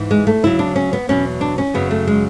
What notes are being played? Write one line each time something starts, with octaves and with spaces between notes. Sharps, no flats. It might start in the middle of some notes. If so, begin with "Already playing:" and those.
Already playing: G#2 E3
G#3
A3
D2 C#3 F#3 E4
D4
C#4
B3
E2 B2 F#3 C#4
D4
C#4
F#2 C#3 F#3 B3
A3
G#3